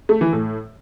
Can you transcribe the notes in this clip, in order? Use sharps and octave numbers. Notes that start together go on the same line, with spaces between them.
A3
E3
A2